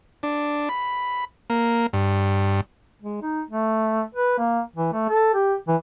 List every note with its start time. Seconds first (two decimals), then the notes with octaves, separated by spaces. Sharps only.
0.23 D4
0.69 B5
1.50 A#3
1.93 G2
3.01 G#3
3.22 D#4
3.50 A3
4.15 B4
4.38 A#3
4.76 E3
4.93 A3
5.09 A4
5.34 G4
5.68 E3